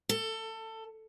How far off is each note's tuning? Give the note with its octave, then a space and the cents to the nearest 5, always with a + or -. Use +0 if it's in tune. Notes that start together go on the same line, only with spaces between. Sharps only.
A4 +20